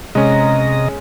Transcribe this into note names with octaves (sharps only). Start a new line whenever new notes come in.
C3 G#3 C#4 D#5 A#5